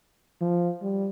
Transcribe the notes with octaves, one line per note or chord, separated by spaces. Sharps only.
F3
G3